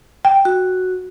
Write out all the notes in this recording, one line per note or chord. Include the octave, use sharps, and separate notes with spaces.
G5
F#4